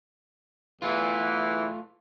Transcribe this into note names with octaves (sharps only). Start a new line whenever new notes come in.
E2 E3 A3 F4